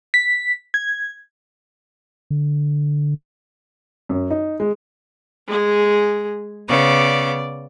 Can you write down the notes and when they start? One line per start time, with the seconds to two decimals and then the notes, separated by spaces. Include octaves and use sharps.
0.14 B6
0.74 G#6
2.30 D3
4.09 F#2
4.31 D#4
4.60 G#3
5.48 G#3 G#4
6.68 C#3 B3 D5 D6